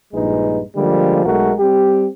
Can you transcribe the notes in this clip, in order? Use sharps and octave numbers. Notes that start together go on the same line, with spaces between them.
A#1 G2 G#3 D#4 B4
D3 F3 G3 G#3 A#3
B1 G#3 A3 F#4 A#4
G3 C4 G4